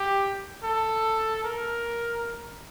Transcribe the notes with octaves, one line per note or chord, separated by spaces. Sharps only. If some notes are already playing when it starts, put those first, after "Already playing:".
Already playing: G4
A4
A#4